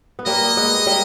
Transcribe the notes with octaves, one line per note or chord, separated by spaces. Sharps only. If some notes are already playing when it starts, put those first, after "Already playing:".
B3
G3 A#3 D#5
G#3 B3
G3 A#3